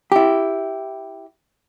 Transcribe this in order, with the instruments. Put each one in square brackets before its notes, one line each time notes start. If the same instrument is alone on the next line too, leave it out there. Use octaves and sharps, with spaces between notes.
[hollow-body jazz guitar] E4 G4